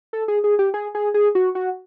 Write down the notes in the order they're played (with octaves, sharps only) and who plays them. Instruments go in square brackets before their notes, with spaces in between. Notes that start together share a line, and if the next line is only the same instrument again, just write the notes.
[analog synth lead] A4
G#4
G#4
G4
G#4
G#4
G#4
F#4
F#4